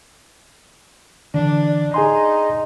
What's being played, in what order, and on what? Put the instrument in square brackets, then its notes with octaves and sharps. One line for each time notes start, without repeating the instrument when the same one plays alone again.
[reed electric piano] D3 E3 [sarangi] D4
[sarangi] D#4 [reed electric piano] G#4 G#5 C6